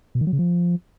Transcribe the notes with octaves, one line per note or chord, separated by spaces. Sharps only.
B2
D#3
F#3
C#3
F3